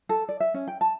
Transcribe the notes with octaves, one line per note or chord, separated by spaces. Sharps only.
A4
D5
E5
C#4
G5
A5